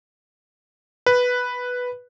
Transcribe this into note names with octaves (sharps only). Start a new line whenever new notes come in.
B4